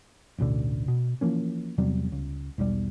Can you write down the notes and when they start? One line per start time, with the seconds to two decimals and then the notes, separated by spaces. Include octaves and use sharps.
0.38 A1 D2 B2 D3
0.88 B2
1.21 E3 F3 A#3 C#4
1.78 E2 C3 F#3 G3
2.12 C#2
2.58 E1 B1 C#3 G3